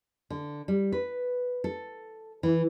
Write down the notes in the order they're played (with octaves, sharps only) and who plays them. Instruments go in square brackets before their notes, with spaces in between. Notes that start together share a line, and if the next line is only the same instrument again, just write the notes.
[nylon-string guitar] D3
G3
B4
A4
E3